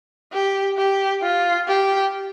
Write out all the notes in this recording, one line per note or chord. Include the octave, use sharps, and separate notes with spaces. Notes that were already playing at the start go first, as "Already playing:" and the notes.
G4
G4
F4
G4